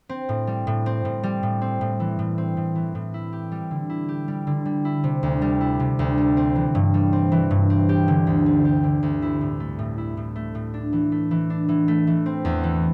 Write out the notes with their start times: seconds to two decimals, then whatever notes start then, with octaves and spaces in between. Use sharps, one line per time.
0.09 C4
0.29 A2
0.47 G3
0.67 A2
0.86 C4
1.05 A2
1.23 G3
1.43 A2
1.62 C4
1.81 A2
2.00 E3
2.19 A2
2.38 C4
2.57 A2
2.75 E3
2.95 A2
3.14 E4
3.33 G4
3.52 G3
3.71 D3
3.90 E4
4.09 G4
4.28 G3
4.47 D3
4.65 G3
4.85 E4
5.04 C3
5.23 D2
5.42 G3
5.61 E4
5.80 C3
5.99 D2
6.18 G3
6.37 C4
6.55 E3
6.75 G2
6.94 G3
7.13 C4
7.32 E3
7.51 G2
7.70 C4
7.89 G4
8.08 D3
8.27 D2
8.46 C4
8.65 G4
8.84 D3
9.03 D2
9.22 E4
9.41 A2
9.60 A3
9.79 A2
9.98 E4
10.17 A2
10.36 A3
10.55 A2
10.74 D4
10.93 E3
11.12 A3
11.31 E3
11.50 D4
11.69 E3
11.88 A3
12.07 E3
12.26 C4
12.45 E2
12.64 E3